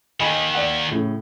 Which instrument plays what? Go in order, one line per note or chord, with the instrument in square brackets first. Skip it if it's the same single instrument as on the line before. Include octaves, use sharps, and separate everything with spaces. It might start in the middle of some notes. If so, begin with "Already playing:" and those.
[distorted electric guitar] D#2 D#3 [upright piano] D#5 G#5 B5
[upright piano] D5 F#5
A2 C#3